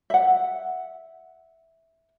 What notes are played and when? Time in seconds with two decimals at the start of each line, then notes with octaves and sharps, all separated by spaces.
0.10 E5 F#5